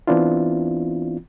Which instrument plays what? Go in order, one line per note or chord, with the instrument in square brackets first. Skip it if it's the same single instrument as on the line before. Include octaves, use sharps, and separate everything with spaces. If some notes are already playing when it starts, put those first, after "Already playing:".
[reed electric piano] E3 B3 C4 D4 E4 F4